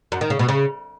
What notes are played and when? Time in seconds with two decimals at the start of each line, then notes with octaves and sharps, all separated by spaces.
0.12 F#2
0.21 D#3
0.30 C#3
0.39 B2
0.49 C#3